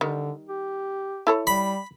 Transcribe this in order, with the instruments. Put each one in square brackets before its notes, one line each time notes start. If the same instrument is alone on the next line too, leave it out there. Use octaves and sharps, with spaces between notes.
[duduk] D3 [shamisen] D#3 G3
[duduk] G4
[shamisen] E4 A4 C#5
[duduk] G3 [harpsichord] B5